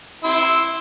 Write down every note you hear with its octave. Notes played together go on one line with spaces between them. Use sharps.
E4 C6 E6